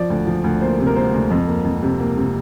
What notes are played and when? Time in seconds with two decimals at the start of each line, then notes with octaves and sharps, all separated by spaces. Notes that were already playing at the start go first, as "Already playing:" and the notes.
Already playing: F3 D5
0.10 D2
0.27 F3
0.44 D2
0.61 A#3 C5
0.79 C3
0.86 A#4
0.96 A#3 C5
1.14 D2
1.30 F2
1.48 A#3
1.64 F2
1.82 C3
2.00 A#3
2.17 C3